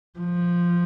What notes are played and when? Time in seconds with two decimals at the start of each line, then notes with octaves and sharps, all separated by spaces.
0.19 F3